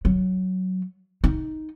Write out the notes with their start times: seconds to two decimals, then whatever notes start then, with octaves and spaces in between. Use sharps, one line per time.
0.05 F#3
1.24 D#4